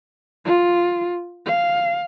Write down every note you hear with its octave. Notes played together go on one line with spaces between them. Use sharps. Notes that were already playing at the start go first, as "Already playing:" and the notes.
F4
F5